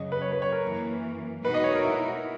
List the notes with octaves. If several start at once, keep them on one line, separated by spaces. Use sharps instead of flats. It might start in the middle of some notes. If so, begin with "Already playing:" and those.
Already playing: F#2 C#3 F#3 D#5
B4
C#5
B4
C#5
A#4
F#2 E3 A#3
B2 G#3 D#4 F#4 B4
D#5
C#5
A#4
E4